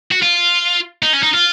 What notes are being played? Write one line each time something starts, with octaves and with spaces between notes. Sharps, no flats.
F#4
F4
D#4
C#4
D#4
F4